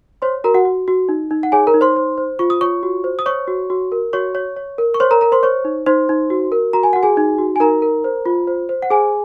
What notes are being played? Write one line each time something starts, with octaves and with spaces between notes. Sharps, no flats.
C5 C#5 C6
F#4 A#4 A#5
F#4 F#5
F#4
F#4
D#4
D#4
F#5
G#4 C#5 G#5
A#4 A#5
D#4
C5 C6
C5
C5
F4 C#6
D#6
F4 C#5 C#6
F#4
C5
D#6
C5 C#5 C#6
F#4
F#4
A#4
F#4 C#5 C#6
C#5
C#5
A#4
C#6
C5 C#5 C6
A#4 A#5
A#4 A#5
C5 C6
C5 C#5 C#6
D#4
D#4 C5 C6
D#4
F#4
A#4
F#4 A#5
G#5
F#4 F#5
G#4 G#5
D#4
F#4
G#5
D#4 A#4 A#5
A#4
C5
F4
C5
C5
F#5
G#4 C5 G#5